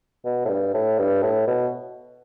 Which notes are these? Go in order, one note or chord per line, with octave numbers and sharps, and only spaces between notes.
B2
A2
G2
A2
G2
A2
B2